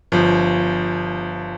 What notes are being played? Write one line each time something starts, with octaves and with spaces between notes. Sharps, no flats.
G1 F3